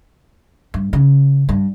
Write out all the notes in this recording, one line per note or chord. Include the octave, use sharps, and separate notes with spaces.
G2
C#3
G2